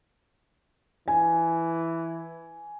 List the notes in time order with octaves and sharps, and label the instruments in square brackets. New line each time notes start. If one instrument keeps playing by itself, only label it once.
[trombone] E3 [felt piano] G#5